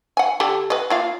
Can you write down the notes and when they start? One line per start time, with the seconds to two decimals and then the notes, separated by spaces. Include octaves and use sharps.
0.17 F#5 G#5
0.40 D3 G4 A4
0.70 B4 D#5
0.90 A#3 F4 F5